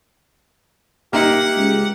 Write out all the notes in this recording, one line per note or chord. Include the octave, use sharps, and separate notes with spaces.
A#3 D#4 G4 E5 F#5
C#2